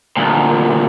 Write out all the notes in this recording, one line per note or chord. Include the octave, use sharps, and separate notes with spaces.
D2 A#2